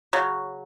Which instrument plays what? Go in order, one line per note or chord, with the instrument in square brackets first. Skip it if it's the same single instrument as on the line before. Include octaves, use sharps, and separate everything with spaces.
[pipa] C#3 F#3